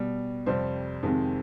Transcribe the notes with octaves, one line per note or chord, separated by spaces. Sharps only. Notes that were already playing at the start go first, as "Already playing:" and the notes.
Already playing: B2 G3
F2 C3 G3 C5
F2 C3 D#3 G#3